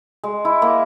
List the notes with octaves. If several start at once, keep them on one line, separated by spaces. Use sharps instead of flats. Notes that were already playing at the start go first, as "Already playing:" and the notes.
G#3
E4
A#3